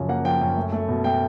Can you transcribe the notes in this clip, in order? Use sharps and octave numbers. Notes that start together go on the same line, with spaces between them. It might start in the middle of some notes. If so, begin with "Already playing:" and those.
Already playing: F#2 C#3 F3
A#3 F#5
F3 G5
F#2 G5
A3
A3
B2
A3 G5